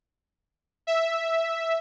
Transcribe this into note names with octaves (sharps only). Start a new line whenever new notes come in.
E5